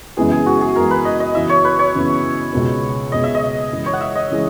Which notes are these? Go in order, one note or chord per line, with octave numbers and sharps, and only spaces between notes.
F#2 C#3 E3 G#3 B3 G#4
G#4
F#4
G#4
F#2 C#3 E3 G#3 B3 A#4
B4
D#5
D#5
F#2 C#3 E3 B3 E5
C#5
B4
C#5
F#2 C#3 E3 B3
C#2 B2 G#3 B3
C#2 B2 G#3 B3 D#5
E5
D#5
F#2 C#3 E3 G#3
C#5
F#5
E5
D#5
C#3 E3 G#3